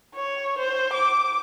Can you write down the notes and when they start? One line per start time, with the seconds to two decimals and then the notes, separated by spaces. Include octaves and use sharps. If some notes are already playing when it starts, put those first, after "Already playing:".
0.15 C#5
0.59 C5
0.94 D6